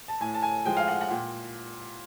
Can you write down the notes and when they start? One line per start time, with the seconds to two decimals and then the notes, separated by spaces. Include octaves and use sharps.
0.08 A5
0.20 A2 G#5
0.34 A5
0.42 G#5
0.65 F3 G#3 G5
0.77 F5
0.88 F#5
1.01 F#5
1.10 A#2 G5